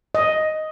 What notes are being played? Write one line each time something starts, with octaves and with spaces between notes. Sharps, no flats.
D#5